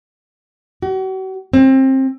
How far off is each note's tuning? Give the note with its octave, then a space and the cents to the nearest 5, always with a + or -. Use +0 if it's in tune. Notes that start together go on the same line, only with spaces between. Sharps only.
F#4 +40
C4 +25